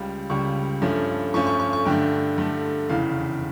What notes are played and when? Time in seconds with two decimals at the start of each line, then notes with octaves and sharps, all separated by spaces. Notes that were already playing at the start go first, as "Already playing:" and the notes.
Already playing: C#2 C#3 G3
0.30 C#2 C#3 G3 C#6
0.82 G2 F3 A3 C#4
1.34 G2 F3 A3 C#4 C#6
1.47 C#6
1.60 C#6
1.73 C#6
1.85 G2 D3 A3 G5
2.38 G2 D3 A3
2.89 F1 E2 C#3 E3 F5